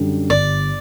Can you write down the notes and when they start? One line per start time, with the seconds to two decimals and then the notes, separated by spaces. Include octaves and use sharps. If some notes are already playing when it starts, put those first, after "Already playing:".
Already playing: F#2 D3 G3
0.30 G1 D5